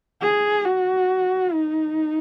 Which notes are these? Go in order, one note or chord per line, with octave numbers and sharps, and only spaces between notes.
G#4
F#4
D#4